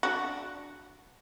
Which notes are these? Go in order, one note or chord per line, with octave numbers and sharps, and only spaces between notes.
D4 F#4